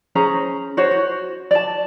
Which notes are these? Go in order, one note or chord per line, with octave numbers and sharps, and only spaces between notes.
C#4 G#4 C5 A#5
F#4 C5 C#5
F#4
D5 A5